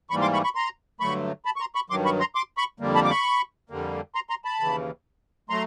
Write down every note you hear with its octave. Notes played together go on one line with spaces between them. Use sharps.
G#2 E3 G3 A#3 B5 C#6
C6 D6
B5 C#6
B5 C#6
A#5 C6
G2 D3 F#3 A3 B5 C#6
A5 B5
C#6
A#5 C6
B5 C#6
G2 D#3 F#3 C6 D6
B5 C#6
A#5 C6
C6 D6
B5 C#6
F2 D3 G3 A#3
A5 B5
D6
B5 C#6
F2 D3 G3 A#3
A#5 C6
A#5 C6
A5 B5
D#2 C#3 E3
F#3 A3 A#5 C6